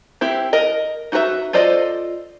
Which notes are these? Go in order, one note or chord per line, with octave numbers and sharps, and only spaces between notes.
C4 E4 G4
A#4 D#5
D#4 F#4 B4 C5 E5
F4 A4 C5 D5 D#5